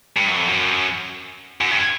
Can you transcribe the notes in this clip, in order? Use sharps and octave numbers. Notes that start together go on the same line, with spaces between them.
G2
F#2
F2
F#2
F#2
G2